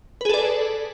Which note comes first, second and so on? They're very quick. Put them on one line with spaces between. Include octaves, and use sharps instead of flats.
B4 G#4 A4 D5